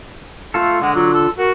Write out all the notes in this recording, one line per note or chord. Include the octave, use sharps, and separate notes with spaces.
A3 F4 A4
D3 G#3 F#5
F#3 F4
A4
F#4 A#4